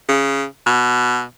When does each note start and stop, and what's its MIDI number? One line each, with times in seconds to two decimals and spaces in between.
0.09 0.45 49
0.67 1.23 47